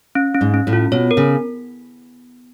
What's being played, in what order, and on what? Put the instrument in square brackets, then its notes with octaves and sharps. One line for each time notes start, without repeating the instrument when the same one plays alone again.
[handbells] C#4
C#4
[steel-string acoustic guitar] G#2
[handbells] C#4
[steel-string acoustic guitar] A2
[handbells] F4
[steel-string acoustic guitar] B2 [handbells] C#5
[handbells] A#4
[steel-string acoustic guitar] C#3